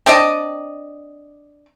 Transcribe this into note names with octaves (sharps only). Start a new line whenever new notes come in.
C4 D4 D5 D#5